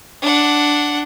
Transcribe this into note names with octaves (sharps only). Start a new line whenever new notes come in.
D4 F#5